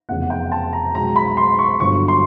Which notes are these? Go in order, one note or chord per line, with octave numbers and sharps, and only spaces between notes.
F1 E2 C#3 F#5
G5
A5
A#5
B1 B2 G#3 A#5
B5
C6
C#6
G1 G2 D3 F#3 C#6
C6